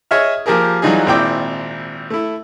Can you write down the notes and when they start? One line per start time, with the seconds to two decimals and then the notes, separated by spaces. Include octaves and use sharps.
0.11 G#4 C#5 D#5 E5 F6
0.46 F3 A#3 G4 G#4 A#4
0.82 E3 F#3 G3 D#4 F4 G#4
1.06 G#1 A#2 C4 E4 G5 D6
2.10 A3 E4